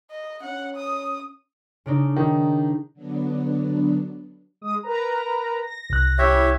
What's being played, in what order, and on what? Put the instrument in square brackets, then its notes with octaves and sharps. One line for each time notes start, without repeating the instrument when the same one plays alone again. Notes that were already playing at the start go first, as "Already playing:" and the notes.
[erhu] D#5
[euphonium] C#4 [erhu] F#5
[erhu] D#6
[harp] C#3 D4 D#4
[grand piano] D#3
[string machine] D3 F#3 B3 D4
[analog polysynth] G#3 D#6
A#4 B4 A#5
A#6
[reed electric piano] C2 F#6
[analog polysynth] C#4 E4 [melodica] G4 C#5 E5